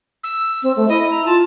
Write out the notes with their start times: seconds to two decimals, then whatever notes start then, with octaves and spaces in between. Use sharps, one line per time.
0.24 E6
0.63 C4
0.76 A3
0.89 E4 D#5
1.11 A#5
1.26 F4 A5